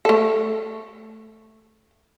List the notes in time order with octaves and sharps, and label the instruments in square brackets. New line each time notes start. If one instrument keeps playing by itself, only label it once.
[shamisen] A3 A4